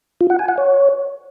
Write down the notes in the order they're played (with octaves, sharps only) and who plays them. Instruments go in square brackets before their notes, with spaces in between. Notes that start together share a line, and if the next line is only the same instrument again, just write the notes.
[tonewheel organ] F4
F#5
G#5
F#5
C#5